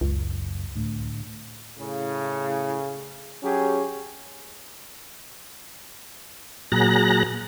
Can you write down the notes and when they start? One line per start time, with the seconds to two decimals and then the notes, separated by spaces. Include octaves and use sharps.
0.01 F#1 C#2
0.75 D2 A2 A3
1.78 A2 C#3
3.43 F#3 C#4 G4 G#4
6.72 A#2 F#3 G#4 A#5 F#6 A#6